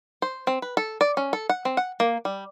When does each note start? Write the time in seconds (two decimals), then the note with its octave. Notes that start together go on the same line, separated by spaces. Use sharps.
0.22 C5
0.47 C4
0.62 B4
0.77 A4
1.01 D5
1.17 C#4
1.33 A4
1.49 F#5
1.65 C4
1.77 F#5
2.00 A#3
2.25 G3